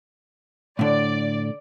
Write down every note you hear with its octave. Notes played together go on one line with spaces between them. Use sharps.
A2 D3 D5